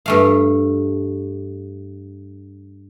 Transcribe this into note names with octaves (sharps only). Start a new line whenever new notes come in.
G2 A3 F5